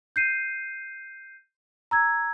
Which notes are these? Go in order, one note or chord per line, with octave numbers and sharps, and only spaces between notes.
G6 C7 D#7
A#5 E6 G#6